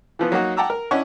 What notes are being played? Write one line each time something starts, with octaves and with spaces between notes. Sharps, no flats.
E3 F3 B3
F#3 A#3 D#4 F#4
F#5 G5 A5 A#5 D6 E6
A#4
C#4 D4 E4 D#5 F#5 C#6